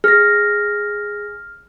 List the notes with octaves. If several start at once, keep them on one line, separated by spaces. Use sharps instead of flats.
G#4 F6 A#6